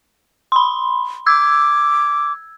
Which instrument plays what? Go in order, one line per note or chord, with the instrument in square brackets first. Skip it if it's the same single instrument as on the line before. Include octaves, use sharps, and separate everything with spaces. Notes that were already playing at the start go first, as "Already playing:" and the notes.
[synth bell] B5 C6
[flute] D6 [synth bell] E6 G#6